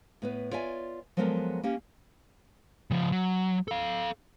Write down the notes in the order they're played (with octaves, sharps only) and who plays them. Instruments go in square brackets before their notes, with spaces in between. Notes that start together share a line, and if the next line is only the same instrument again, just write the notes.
[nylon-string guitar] A2 B3 B4
F4 C#5 D5 E5 G#5
F3 F#3 G#3 B3 A4 A#4
A#3 C#4 G4
[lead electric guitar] C#3 F3
F#3
A4 F5